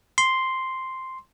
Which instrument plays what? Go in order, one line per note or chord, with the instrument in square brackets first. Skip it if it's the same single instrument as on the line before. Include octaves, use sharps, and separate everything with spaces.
[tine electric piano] C6